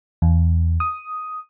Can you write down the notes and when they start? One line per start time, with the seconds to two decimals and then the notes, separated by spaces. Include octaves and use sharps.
0.22 E2
0.80 D#6